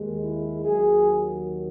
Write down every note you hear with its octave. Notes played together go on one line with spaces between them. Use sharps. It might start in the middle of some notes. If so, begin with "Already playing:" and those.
Already playing: D#2 D#3 G#3
E4
D#2 D#3 F#3 G#4